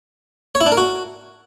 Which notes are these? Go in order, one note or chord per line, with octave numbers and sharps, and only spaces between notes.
C#5
E4
D4
A#4
F#4